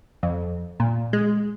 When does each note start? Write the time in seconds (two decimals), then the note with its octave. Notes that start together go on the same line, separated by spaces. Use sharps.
0.23 F2
0.80 A#2
1.13 G#3